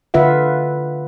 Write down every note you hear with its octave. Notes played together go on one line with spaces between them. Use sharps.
D3 F4 B4 E5 F#5